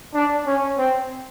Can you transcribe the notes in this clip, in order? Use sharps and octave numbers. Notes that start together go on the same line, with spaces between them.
D4
C#4
C4